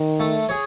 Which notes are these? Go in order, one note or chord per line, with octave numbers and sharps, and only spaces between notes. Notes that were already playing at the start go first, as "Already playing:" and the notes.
Already playing: D#3
A3
G#4 C#5